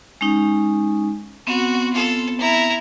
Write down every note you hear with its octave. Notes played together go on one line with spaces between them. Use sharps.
G#3 C#4 D#4
B3 C4 F#4
F4 A4
E4 A#5